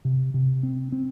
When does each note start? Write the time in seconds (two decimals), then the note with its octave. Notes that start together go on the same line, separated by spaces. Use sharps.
0.05 C3
0.34 C3
0.63 C4
0.92 C4